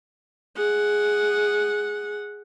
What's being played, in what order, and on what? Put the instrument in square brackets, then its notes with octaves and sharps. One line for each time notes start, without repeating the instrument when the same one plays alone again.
[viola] G#4 F#5